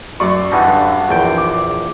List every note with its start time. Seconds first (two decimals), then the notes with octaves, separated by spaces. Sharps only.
0.20 F#2 D5 C#6
0.52 E3 G3 D#4 F#5 A5
0.64 G2 D3
1.09 A#1 E2 G5
1.38 D6